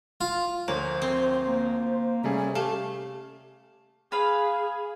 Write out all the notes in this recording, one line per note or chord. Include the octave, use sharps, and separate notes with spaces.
F4
D2 F3 A#3 C5 C#5
C4
A#3
C3 G3 A3 C#4 G#4
A3 G4 F5
G#4 B4 F5 B5